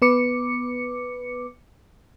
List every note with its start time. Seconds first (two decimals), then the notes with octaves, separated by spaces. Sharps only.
0.02 B3 B4 D6 C#7